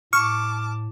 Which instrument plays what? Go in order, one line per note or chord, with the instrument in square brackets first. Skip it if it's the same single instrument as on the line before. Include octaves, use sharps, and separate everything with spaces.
[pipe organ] A2 [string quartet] A5 D6 [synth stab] C#6 [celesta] F6